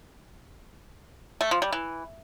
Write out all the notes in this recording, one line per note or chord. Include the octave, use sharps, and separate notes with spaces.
A3
F3
G3
E3